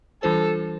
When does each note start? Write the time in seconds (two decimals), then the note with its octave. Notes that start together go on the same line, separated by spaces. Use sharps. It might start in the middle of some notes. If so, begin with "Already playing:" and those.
0.22 E3 G3 D4 F4 A4 C5